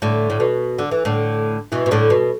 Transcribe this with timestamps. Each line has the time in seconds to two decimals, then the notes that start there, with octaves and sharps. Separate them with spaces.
0.02 A2 D3
0.30 A2
0.40 B2
0.78 D3
0.91 E3
1.05 A2 D3
1.72 B2 E3
1.86 B2
1.91 A2 D3
2.10 B2